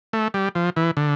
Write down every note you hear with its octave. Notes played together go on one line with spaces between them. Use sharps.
A3
G3
F3
E3
D3